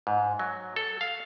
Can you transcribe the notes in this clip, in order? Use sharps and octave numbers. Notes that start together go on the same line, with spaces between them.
G#2
F#3
A4
F5